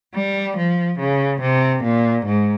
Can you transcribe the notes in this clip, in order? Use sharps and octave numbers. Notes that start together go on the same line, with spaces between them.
G3
F3
C#3
C3
A#2
G#2